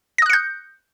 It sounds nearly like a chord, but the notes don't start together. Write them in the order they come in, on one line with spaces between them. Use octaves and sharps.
A#6 D#6 F#6 C#7 G6